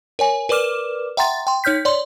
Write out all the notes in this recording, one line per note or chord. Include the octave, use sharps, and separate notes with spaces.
A#4 C#5 G#5
A#4 B4 D5 D6 F6 E7
E5 F#5 G5 A#5 C6 A6
G5 C6
D#4 C#5 F6 G6 B6
C#5 D5 C6